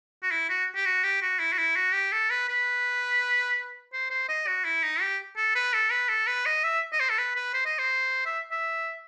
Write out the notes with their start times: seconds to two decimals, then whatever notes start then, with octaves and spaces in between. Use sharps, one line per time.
0.23 F#4
0.31 E4
0.49 F#4
0.75 G4
0.85 F#4
1.04 G4
1.22 F#4
1.39 E4
1.53 F#4
1.58 E4
1.76 F#4
1.93 G4
2.12 A4
2.30 B4
2.49 B4
3.93 C5
4.10 C5
4.29 D#5
4.47 F#4
4.64 E4
4.83 D#4
5.01 G4
5.37 A4
5.55 B4
5.73 A4
5.91 B4
6.09 A4
6.27 B4
6.46 D#5
6.64 E5
6.93 D#5
7.00 C5
7.10 A4
7.18 B4
7.36 B4
7.54 C5
7.66 D#5
7.78 C5
8.26 E5
8.51 E5